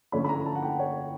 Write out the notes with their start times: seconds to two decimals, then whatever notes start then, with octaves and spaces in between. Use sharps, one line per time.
0.12 D3 F3 A3 C#4 B5
0.25 B5
0.29 A#5
0.46 A5
0.55 F#5
0.63 G5
0.79 C#5